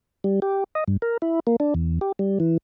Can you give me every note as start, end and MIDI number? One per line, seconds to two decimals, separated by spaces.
0.24 0.40 55
0.42 0.64 67
0.75 0.84 75
0.88 0.97 43
1.02 1.17 70
1.22 1.40 64
1.47 1.56 58
1.60 1.74 62
1.75 1.99 40
2.01 2.12 67
2.19 2.38 55
2.40 2.57 52